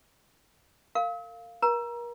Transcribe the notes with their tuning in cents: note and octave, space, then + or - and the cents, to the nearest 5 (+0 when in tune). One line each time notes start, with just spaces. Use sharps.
A#4 -40 F5 +0
A#4 +35 A#5 +20